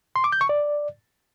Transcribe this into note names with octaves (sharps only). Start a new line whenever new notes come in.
C6
D6
G6
C#6
D5